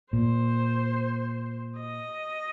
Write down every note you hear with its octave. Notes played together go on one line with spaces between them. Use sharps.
A#2 C5
D#5